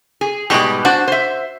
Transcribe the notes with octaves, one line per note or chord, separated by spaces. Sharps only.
G#4
G#2 B2 G3 G4 G#4
D4 F#4 C5 F#5
C5 E5